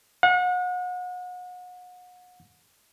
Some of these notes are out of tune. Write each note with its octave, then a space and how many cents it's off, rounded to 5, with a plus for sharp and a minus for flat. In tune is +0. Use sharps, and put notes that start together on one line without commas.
F#5 -35